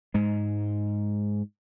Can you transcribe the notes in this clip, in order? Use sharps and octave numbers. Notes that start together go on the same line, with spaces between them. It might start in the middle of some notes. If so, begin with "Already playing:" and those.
G#2 G#3